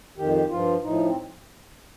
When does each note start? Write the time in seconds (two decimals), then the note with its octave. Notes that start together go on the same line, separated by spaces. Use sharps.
0.18 F2 D#3 G4
0.34 G4
0.50 G2 F3 F4
0.83 A2 F3 D#4
1.06 C4